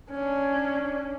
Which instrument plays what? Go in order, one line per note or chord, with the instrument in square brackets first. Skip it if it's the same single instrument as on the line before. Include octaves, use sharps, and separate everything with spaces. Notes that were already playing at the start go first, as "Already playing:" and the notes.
[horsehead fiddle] C#4 D4